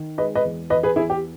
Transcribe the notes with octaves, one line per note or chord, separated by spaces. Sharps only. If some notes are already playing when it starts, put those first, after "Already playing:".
Already playing: D#3
G#3 B4 D#5
B4 D#5
E2
E2 B4 D#5
G#4 B4
E2 E4 G#4
G4